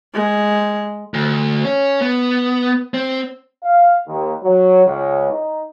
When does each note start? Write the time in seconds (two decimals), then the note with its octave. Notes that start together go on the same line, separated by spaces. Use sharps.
0.15 G#3
1.14 D2
1.65 C#4
2.01 B3
2.94 C4
3.62 F5
4.06 D#2
4.43 F#3
4.85 C#2
5.31 D#4